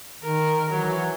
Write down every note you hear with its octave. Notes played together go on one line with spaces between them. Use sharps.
D#3 A#4
E3 F#3